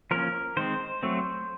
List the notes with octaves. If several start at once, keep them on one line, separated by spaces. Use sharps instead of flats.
F3 A#3 C#4 A#4
D#3 G#3 C4 C5
F#3 A3 C4